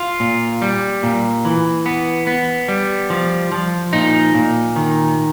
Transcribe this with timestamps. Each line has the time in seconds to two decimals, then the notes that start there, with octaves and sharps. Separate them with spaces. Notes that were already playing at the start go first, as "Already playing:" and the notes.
Already playing: F4
0.20 A#2
0.62 G3
1.03 A#2
1.45 E3
1.86 B3
2.27 B3
2.68 G3
3.10 F3
3.52 F3
3.93 A#2 D#4
4.35 A#2
4.76 D#3